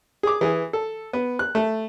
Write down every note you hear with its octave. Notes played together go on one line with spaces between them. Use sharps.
G#4 D6
E3 G#4
A4
B3
F#6
A3